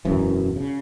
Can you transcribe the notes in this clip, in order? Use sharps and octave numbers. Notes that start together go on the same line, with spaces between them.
E1 F#2 E3
C#3